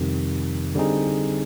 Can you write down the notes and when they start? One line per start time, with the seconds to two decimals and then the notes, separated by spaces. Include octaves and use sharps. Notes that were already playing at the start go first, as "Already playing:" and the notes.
Already playing: F2 C3 D#3 G3
0.75 D3 G3 C4 D#4 G#4